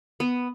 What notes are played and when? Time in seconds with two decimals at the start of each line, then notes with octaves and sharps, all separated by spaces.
0.20 B3